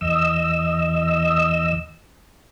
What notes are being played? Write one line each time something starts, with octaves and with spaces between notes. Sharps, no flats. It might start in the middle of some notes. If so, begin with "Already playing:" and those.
E2 D#5 E6